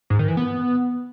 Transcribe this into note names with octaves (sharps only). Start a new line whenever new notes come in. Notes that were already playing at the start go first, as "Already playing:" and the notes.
G#2
D#3
E3
B3